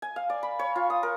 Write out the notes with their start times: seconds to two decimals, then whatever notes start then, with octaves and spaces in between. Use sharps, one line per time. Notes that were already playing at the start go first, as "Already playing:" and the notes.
0.02 G#5
0.16 F5
0.30 D5
0.43 B5
0.59 C#5
0.76 F4
0.90 D#6
1.03 A#4